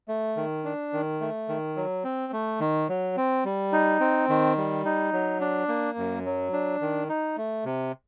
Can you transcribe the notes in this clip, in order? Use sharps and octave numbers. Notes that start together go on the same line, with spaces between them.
A3
D#3
D4
D#3
A3
D#3
F#3
C4
A3
D#3
F#3
C4
G3
D#4
C4
D#3
G3
D#4
F#3
D4
A#3
F#2
F#3
D4
D#3
D#4
A3
C3